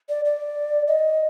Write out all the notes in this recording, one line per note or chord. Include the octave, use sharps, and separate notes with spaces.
D5
D5
D#5